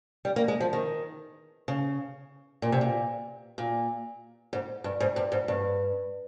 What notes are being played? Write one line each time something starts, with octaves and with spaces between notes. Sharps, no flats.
G3
A#3
G#3
F3
D#3
C#3
A#2
C3
A#2
A#2
G#2
G2
G#2
G2
G#2
G2